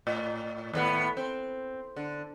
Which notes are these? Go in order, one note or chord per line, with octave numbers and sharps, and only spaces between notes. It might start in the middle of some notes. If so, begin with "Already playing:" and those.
A2
D#2 A2 B3
C4
D3